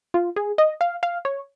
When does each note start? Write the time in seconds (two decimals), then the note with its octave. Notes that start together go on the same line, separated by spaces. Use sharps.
0.14 F4
0.36 G#4
0.58 D#5
0.81 F5
1.03 F5
1.25 C#5